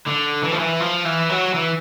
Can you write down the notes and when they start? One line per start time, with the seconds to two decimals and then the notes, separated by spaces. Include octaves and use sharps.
0.06 D3
0.43 E3
0.52 F3
0.59 E3
0.80 F3
1.05 E3
1.30 F#3
1.54 E3